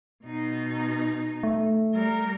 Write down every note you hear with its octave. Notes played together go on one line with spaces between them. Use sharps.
B2 D#4
A3
G3 A#4